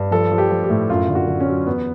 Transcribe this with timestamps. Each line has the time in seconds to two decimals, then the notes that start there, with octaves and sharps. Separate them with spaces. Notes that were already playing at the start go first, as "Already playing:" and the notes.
Already playing: G2
0.11 F3 A4
0.32 F3
0.38 G4
0.50 F3
0.64 G4
0.70 A2
0.89 F#2 F4
1.08 D3
1.15 F#4
1.28 D3
1.40 C#4
1.47 F#3
1.66 E2 B3